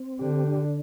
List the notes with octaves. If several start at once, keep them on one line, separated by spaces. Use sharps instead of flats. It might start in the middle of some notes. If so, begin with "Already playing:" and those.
Already playing: C4
D3 G4
D4